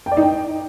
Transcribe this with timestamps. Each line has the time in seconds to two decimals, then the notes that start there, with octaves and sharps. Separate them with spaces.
0.06 G5
0.12 D5
0.17 D#4
0.22 G5